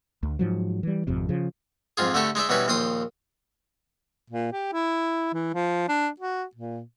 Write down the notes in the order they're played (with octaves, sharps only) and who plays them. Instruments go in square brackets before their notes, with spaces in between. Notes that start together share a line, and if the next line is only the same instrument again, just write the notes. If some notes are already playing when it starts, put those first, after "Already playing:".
[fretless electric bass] D2
G#2 F3 F#3
E3 G3
G#1 F2 C3
C#3 F3
[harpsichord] F2 G#2 F4 G#4
D3 A3 F#4 G4 A4
G#3 D#4 D5 E5
B2 E3 G3 C#4 B4
A#1 D#2 G5 C6 D#6
[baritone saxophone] A#2
G4
E4
E3
F3
D4
F#4
A#2